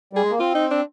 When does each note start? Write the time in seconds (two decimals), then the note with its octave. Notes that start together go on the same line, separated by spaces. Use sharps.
0.13 G3 G#4
0.23 G#3
0.30 A#3
0.39 C4 F4
0.55 D#4
0.71 D4